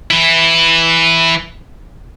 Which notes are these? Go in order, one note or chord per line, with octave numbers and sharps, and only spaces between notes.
E3 E4